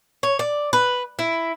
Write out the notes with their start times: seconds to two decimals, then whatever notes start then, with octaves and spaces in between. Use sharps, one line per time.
0.23 C#5
0.39 D5
0.73 B4
1.19 E4